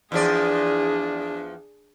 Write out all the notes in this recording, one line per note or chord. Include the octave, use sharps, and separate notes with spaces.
E2 F3 D4 G#4 D5